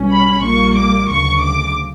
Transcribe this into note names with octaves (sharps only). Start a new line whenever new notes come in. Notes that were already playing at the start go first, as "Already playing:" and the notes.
Already playing: B1 B2 G3 C#4
B5
A#1 A#2 G3 A#3 C#6
D6
D2 C#3 F#3 C#6
D6